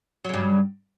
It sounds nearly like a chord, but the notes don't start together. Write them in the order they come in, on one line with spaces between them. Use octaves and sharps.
F#3 C#3 G2